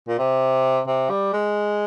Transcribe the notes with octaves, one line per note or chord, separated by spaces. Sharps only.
A#2
C3
C3
G3
G#3